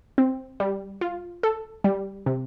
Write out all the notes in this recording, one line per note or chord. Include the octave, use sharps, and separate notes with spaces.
C4
G3
F4
A4
G3
C3